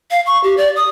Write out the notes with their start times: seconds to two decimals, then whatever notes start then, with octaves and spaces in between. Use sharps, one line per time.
0.11 F5
0.26 C#6
0.44 G4
0.57 D5
0.76 D#6